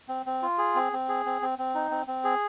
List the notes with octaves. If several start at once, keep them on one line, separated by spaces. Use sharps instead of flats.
C4
C4
F4
G#4
C4
C4
G#4
C4
C4
C4
D#4
C4
C4
G#4